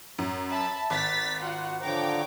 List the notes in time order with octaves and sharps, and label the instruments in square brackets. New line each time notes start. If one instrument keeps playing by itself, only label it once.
[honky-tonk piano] F#2
[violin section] E5 A5 B5
[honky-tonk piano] G#1 [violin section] A6 B6
[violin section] F4 F#4 F#5
[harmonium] D3 F3 A#5 [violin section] C#5 G5 D6